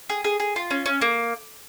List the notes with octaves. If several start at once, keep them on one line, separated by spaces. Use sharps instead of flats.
G#4
G#4
G#4
F4
C#4
C#4
A#3